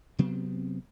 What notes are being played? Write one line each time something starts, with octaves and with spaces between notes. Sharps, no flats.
C3 F#3 B3 C4